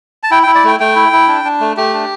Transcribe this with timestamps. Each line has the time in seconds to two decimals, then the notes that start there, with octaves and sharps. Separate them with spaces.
0.23 A5
0.31 E4 G5
0.43 G5
0.47 E4
0.55 D5
0.64 A3 G5
0.80 A3 G5
0.96 E4
1.12 E4
1.28 D4
1.44 D4
1.60 A3
1.77 A3 G4
1.93 D4